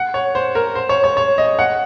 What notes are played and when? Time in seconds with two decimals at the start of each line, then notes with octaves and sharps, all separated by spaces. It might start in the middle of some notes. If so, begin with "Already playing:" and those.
Already playing: F#5
0.14 C#5
0.35 C5
0.55 A#4
0.75 C5
0.89 C#5
1.04 C#5
1.17 C#5
1.38 D#5
1.59 F#5